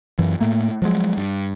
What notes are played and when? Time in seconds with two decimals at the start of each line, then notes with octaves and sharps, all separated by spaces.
0.19 F#2 E3
0.41 A2 A3 A#3
0.82 F3 F#3 G#3
1.17 G2